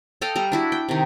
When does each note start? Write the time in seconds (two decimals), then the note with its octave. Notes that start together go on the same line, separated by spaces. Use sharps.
0.21 A4 D#5 F5 G5
0.36 G3 A#5
0.52 D4 E4 F#4
0.72 G5
0.89 C3 D#3